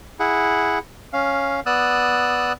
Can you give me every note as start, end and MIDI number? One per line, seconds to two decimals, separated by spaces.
0.20 0.79 64
0.20 0.79 68
0.20 0.79 78
1.13 1.60 61
1.13 1.60 77
1.66 2.52 59
1.66 2.52 74
1.66 2.52 87
1.66 2.52 88
1.66 2.52 90